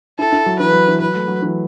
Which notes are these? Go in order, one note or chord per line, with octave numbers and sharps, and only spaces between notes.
E4 A4
E4
F#3
E3 B4
F#3
E3
F#3 B4
A3
F#3
E3